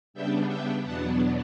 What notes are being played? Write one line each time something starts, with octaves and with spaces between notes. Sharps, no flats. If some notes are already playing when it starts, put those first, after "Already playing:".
C#3 G3 B3 D4 E5 G5
E5 G5
E2 B2 F#3 B3 D4 F#5 A5